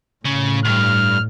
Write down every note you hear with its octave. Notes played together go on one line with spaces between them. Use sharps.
A2 C#3
C#2 G2 F6